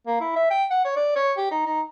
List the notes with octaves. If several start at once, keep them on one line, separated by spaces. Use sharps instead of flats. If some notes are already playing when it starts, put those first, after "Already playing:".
A#3
E4
E5
G5
F#5
C#5
D5
C#5
G4
D#4
D#4